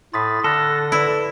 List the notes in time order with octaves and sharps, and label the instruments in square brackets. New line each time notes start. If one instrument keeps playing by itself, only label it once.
[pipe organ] A2 A6 [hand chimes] C6 D#6 B6
[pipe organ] D3 A#6 [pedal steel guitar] A4 [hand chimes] F6 F#6 A6
[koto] E4 [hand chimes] B4 D5